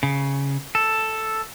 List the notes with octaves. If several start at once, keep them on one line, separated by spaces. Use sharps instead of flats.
C#3
A4